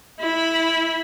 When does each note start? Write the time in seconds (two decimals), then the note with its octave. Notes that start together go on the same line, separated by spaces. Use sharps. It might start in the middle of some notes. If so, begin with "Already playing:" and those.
0.20 E4 B5